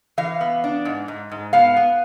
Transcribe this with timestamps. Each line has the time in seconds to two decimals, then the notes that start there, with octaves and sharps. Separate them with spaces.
0.18 E3 F5
0.41 B3
0.64 D4
0.85 G#2
1.08 G#2
1.31 G#2
1.53 B3 F5
1.77 B3